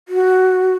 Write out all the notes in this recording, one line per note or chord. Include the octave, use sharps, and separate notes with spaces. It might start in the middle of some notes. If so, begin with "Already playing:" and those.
F#4